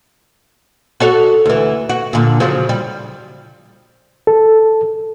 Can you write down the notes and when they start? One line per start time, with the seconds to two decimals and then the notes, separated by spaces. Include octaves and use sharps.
1.00 F#4 A4 C#5
1.46 D2 E3
1.89 F#4
2.13 A#2 D3
2.40 C#3 F3 F#3
2.69 G3
4.27 A4